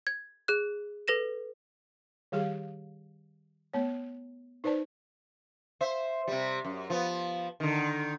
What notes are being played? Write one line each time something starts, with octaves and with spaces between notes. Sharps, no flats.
G#6
G#4 F#6
A4 B4 A#6 E7
D#3 G3 G4 G#4 F5
A3 B3 C#5
D#4 B4 C5 D5 A5
C5 E5
C3 G3
F#2
F3 B3
D3 D#3